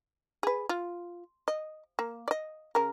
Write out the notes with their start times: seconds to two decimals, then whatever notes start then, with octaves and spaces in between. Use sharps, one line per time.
0.43 G#4 B4
0.69 F4
1.48 D#5
1.99 A#3
2.28 D5 D#5
2.75 C#3 A#4